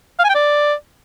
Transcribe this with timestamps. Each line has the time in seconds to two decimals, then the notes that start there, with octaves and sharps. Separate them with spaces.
0.19 F5
0.24 G#5
0.29 G5
0.35 D5